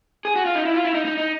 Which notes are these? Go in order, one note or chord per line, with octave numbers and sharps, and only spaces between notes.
G#4
F#4
F4
D#4
E4
F4
E4
D#4
D#4
D#4